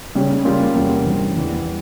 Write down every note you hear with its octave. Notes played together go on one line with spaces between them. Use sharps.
C#3 G3 C#4 G4
C#3 G3 A#3 F4
E2 C3 G3 A#3 C#4
G2 E3 G3 C4
E2 E3 G3